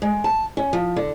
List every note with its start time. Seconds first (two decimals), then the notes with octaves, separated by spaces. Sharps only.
0.02 G#3
0.24 A5
0.57 C#4
0.73 F3
0.96 D3